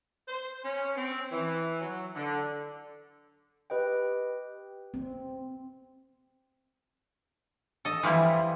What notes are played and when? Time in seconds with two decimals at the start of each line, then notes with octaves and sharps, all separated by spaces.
0.28 C5
0.64 C#4
0.96 C4
1.30 E3
1.80 F#3
2.15 D3
3.70 G4 B4 D#5 G5
4.94 C4
7.85 A4 D#5
8.03 E3 F3 G3 E4